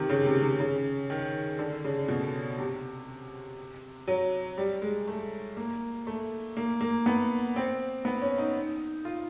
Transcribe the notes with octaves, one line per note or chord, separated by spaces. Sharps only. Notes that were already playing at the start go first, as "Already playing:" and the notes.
Already playing: C3 D#3
C#3
C3
C3
C#3
D#3
D3
C#3
B2
C3
F#3
G3
G#3
A3
A#3
A3
A#3
A#3
B3
C4
B3
C#4
D#4
F4